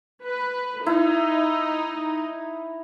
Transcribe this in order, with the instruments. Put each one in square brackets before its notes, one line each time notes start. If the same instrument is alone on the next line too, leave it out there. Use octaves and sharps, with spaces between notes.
[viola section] B4
[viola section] D#4 [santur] E4